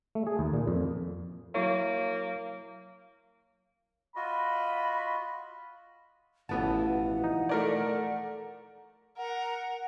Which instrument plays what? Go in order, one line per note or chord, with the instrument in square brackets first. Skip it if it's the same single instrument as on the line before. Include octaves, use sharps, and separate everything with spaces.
[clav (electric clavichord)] A3
G#4
D#2
A#2
F2
[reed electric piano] F#3 E4 C#5 [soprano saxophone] A#3
[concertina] F4 F#4 D#5 [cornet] B5
[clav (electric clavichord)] A1 B3 A5 [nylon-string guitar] B2 E3 F3 [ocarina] F#5
[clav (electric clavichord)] D#4
[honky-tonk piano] A3 A#4 D5
[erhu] A#4 [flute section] F#5